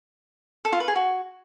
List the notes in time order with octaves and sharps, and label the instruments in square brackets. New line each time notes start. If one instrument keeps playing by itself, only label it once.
[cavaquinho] A4
F4
B4
G#4
F#4